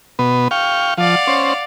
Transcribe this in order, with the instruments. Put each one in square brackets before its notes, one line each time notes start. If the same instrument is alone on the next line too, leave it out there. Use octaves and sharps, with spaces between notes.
[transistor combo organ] B2 B3
F5 G5 C#6
[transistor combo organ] F3 [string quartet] D5 F5 F#5
[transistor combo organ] C#4 C5